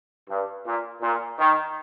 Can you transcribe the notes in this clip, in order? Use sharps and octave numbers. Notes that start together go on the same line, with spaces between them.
G2
A#2
A#2
D#3